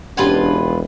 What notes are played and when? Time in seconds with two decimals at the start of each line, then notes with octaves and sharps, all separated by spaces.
0.17 E1 C#4 D4 F4 G4 B4 F#5 G#5